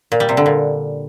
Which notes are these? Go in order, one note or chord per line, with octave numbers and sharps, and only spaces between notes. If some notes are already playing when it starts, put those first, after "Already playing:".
A#2
G3
C3
D3
A#2